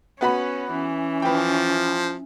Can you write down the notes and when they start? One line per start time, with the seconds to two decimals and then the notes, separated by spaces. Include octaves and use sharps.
0.21 B3 C#4 F#4 B5
0.71 E3 C#4
1.22 F3 B4 G5